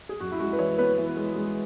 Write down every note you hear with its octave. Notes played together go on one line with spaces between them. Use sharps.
G#4
F#2 F#4
E4
G#3 F#4
B4
E3 C#5
B3 B4
E3
G#3
G#3